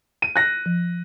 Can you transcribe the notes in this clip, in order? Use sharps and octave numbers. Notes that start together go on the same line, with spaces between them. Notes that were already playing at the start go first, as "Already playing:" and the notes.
D#7
F#6 A#6
F3